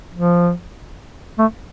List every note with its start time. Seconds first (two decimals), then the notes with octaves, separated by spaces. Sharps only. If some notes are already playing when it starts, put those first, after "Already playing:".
0.15 F3
1.39 A3